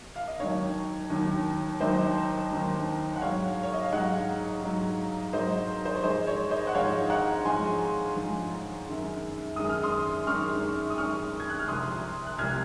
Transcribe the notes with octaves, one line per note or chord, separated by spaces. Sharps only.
F5
D#5
D#2 D#3 F#3 C#5
D#2 D#3 F#3
D#2 D#3 F#3 C5 D#5
D#2 D#3 F#3
F#5
G#2 F#3 C#5 F5
C#5
D#5
F5
G#2 F#3 D#5 F#5
G#2 F#3
G#2 F#3 C5 D#5
C5
C#5
G#2 F3 G#3 C5 D#5
C#5
C5 D#5
F#5
G#2 F3 G#3 C#5 F5
F#5 A#5
G#2 F3 G#3 G#5 C6
G#2 F3 G#3
F#2 D#3 G#3
F#2 D#3 G#3 D#6
F6
C6 D#6
F#2 D#3 G#3 C#6 F6
D#6
F#2 D#3 G#3 C#6 F6
G#6
F#6
F6
C2 C3 F3 C6 D#6
F#6
C2 C3 F3 F6 G#6